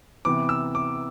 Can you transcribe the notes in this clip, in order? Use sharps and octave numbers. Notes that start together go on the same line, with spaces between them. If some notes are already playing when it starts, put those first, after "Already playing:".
C3 E3 B3 D6
E6
D6